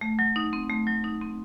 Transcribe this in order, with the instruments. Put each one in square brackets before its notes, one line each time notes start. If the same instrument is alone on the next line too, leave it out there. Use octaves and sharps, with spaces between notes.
[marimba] A3
F#3
D#4
C4
A3
F#3
D#4
C4